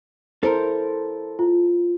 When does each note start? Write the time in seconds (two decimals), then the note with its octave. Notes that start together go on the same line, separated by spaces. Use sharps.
0.43 E4 A4 A#4 C5
1.39 F4